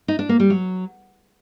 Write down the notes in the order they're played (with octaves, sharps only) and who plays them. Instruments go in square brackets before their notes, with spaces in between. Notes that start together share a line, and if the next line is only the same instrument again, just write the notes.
[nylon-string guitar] D#4
D4
A#3
G3
F#3